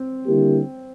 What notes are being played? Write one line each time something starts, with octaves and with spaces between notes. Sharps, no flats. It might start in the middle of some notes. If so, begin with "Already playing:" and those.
Already playing: C4
D3 G3 A#3 E4 G4